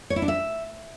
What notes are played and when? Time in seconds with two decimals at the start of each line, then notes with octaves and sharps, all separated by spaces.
0.10 C#5
0.16 E4
0.22 D4
0.28 E5